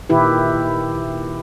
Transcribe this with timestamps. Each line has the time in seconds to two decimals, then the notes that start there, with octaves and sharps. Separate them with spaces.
0.09 A#2 D#3 E4 G4 B4